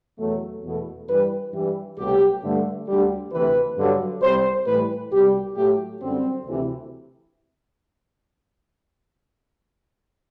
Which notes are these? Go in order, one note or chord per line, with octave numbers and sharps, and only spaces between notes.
E2 B2 F#3 A3
E2 B2 A3
G2 E3 G3 B4
G2 E3 G3
C2 B2 F#3 A3 G4
G2 D3 A3
D2 D3 G3 G4
D2 C3 E3 B4
G2 D3 F#3
C2 C3 G3 C5
A2 E3 G3 B4
C2 B2 G3 G4
A2 F#3 A3 G4
F#2 D3 G3 C4
D2 C3 E3